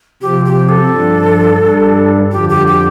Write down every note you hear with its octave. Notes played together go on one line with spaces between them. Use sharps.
C3 F3 C4 G4
G4
A4
G2 F3 D4
G2 G3 D4
F2 D3 F3 G4
G4
G4